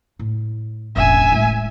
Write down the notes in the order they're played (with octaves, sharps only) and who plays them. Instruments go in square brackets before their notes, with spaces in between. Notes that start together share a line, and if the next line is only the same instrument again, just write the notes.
[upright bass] A2
[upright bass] E1 A1 [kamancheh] E5 G#5
[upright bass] A2 G#3